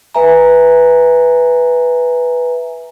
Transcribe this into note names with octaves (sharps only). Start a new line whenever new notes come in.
B4 E5 G#5 A#5